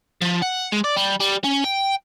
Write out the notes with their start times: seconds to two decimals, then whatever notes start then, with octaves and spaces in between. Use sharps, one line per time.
0.22 F3
0.42 F#5
0.72 G#3
0.84 D5
0.96 G3
1.20 G3
1.44 C#4
1.64 G5